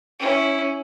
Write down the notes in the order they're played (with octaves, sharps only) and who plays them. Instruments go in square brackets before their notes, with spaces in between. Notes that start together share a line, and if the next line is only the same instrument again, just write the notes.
[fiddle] C#4 E4